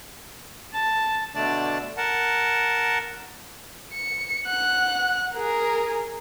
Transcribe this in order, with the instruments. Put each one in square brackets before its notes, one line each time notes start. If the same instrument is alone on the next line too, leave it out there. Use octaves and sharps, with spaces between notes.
[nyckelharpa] A5
[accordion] B2 D3 A3 D4 D5 A5
A#4 F#5 A5
[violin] C#7
F#5 F#6
G#4 A#4